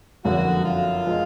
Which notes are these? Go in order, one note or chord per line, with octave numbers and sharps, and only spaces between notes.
F#1 F2 D3 F#4
F4
F3 G#3